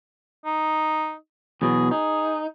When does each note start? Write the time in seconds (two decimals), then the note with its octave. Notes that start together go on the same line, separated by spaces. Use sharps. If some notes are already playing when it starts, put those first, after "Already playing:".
0.45 D#4
1.62 E2 B2 F#3 G#4
1.91 D#4 G#4